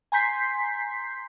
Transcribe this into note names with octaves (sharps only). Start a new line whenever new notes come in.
G#5 A#5 C6 G6 B6 C7